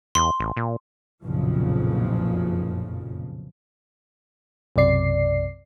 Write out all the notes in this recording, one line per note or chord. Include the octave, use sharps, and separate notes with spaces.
E2 C6
A1
A#2
F#1 B1 F2 A#2 C#3 F3
B1 F#2 C3 D5 C7